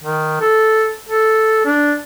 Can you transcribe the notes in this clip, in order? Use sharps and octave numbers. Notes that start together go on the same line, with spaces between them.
D#3
A4
A4
D4